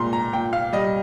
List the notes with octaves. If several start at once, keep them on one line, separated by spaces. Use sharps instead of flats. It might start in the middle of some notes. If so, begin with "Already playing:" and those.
Already playing: A#2 G#3 A#5 C6
A#5
A#2 G5
F5
G3 D#5